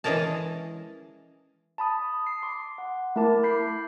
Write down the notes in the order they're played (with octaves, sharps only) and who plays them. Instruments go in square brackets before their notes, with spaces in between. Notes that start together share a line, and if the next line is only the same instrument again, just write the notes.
[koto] E3 G#3 C#4 G#4 A#4 A5
[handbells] A5 B5 D#6
C7
C6 D6
F#5
A3 E4 A#4 A5 D6
B5 D6 G6 B6 C7